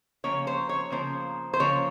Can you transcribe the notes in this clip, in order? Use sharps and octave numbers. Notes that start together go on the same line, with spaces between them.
C#3 F3 A#3 C#5
C5
C#5
C#3 F3 A#3 C5
C5
C#3 F3 A#3 C#5